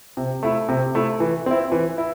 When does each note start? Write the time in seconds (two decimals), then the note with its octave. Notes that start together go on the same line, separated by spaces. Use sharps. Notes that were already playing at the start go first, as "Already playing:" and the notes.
0.17 C3
0.43 A3 E4
0.69 C3
0.95 A3 E4
1.20 E3
1.46 C4 E4
1.72 E3
1.98 E4